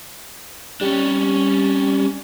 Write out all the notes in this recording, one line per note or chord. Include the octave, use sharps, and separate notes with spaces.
G3 C#4 D4